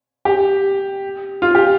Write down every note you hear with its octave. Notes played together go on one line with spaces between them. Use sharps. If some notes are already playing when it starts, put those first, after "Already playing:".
G4
F4
G4